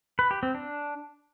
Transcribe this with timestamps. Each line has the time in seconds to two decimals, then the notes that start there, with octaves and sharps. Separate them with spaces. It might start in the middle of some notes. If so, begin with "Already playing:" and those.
0.19 B4
0.31 G4
0.43 C4
0.55 D4